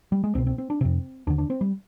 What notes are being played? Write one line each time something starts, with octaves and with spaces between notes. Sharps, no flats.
G3
G#3
C2 B2 C4
C4
C4
D4
F2 C3 C4
D#2 D3 D4
D4
C4
G3